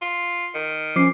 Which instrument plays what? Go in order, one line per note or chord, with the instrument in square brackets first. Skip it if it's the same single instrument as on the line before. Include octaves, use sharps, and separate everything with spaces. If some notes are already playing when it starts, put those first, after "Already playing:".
[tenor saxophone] F4
D#3
[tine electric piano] F3 D6 C7 [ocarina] C#4